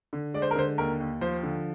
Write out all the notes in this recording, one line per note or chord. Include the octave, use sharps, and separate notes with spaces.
D3
G#3 D5
C5
A#4
D3 C5
D#2 A#4
D#2
F3 C5
D3